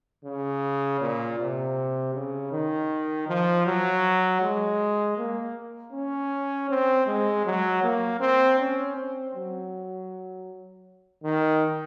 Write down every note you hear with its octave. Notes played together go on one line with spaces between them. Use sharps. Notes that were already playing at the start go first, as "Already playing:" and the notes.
C#3
A#2
C3
C#3
D#3
F3
F#3
G#3
A#3
C#4
C4
G#3
F#3
A#3
C4
C#4
C4
F#3
D#3